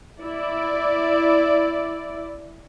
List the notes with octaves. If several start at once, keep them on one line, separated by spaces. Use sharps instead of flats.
E4 D5